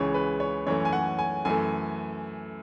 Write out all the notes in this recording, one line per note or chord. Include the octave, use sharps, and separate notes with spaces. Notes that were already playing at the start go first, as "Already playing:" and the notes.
Already playing: C#2 C#3 E3 G#3 C#5
B4
C#5
F#2 E3 A3 C#4 C#5
G#5
F#5
G#5
F#2 E3 A3 G#5